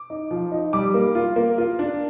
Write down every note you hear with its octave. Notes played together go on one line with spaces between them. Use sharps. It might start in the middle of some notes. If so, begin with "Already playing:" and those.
Already playing: D6
D#4
F3
D#4
G3 D6
A#3
F4
A#3
F4
D4